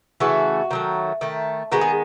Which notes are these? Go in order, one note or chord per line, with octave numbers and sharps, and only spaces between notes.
C#3 E3 A3 F#4
D#3 F#3 A3
D#3 A3
D#3 G#3 B3 F#4
G#4